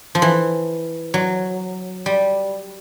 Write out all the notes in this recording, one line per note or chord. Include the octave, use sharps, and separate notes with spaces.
F3
E3
F#3
G3